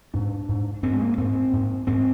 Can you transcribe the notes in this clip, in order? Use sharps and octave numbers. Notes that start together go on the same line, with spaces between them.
G#2 D4
G#2
G#2 C4
G#3
A#3
G#2 C4
G#2
G#2 C4